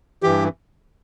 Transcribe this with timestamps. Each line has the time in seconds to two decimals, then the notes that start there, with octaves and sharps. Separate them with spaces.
0.23 G2 E3 G4